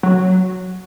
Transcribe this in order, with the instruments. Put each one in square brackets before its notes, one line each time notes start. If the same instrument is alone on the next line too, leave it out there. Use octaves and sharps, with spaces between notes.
[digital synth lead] F#3